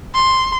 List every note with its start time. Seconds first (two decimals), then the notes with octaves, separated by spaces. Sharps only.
0.15 C6